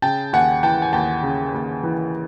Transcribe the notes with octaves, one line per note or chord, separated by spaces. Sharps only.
C#3 G5 A5
D#2 F#5 G#5
E3 G5 A5
G#5
D#2 G5 A5
C#3
D#2
E3